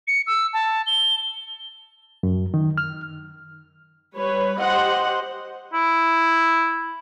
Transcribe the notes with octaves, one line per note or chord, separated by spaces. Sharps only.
C#7
E6
A5
G7
F#2
D#3
F6
G3 B4 C#5
G4 C5 D#5 F#5
E4